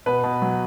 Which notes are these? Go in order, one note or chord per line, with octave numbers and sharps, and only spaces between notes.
B2 B4
B2
F#3